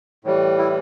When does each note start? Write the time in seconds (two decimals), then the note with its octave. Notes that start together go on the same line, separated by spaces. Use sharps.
0.24 A2 E3 G3
0.58 E4